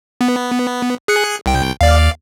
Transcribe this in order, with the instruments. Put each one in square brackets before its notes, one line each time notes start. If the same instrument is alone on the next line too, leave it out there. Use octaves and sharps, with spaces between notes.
[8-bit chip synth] B3
G#4 F#6 C#7
C2 G5
[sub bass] D#2 [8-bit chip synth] D5 F5